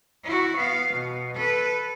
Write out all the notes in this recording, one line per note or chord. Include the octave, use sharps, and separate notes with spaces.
E4 F#4
B3 F5
B2
A4 B4